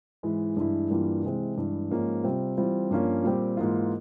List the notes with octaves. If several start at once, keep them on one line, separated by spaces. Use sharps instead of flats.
G#2 E3 G#3 E4
G2 E3 G#3 E4
G2 E3 G3 A#3 F4
C3 E3 G#3 C4
G2 E3 G#3
G#2 F3 A#3 C#4
C3 G3 C4 F4
E3 G3 C4 F4
G2 F3 A#3 C#4 F4
A#2 G3 C4 G4
G#2 E3 A#3 F4